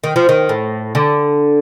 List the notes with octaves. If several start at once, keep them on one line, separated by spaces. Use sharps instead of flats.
D#3
F3
D#3
A2
D3